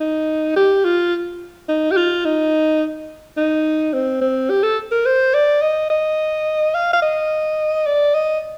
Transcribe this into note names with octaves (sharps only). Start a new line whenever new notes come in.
D#4
G4
F4
D#4
G4
F4
D#4
D#4
C4
C4
G4
A4
A#4
C5
D5
D#5
D#5
F5
F5
D#5
D5
D#5